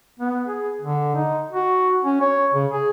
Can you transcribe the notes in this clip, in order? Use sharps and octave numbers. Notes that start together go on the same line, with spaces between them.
B3
G#4
D3
D#4
F#4
C#4
C#5
C#3
G#4